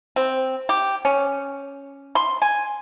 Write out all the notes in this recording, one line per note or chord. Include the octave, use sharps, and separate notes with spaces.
C4
G4
C#4
C6
G#5